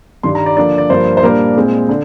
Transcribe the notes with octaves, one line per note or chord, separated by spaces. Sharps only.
G2 D#3 G3 C6
A#5
D5
D3 F3 A#3 D4 D5
D5
G2 F3 A#3 C5
C5
A#2 G3 A#3 D4 A#4
A#2 G#3 C4
D3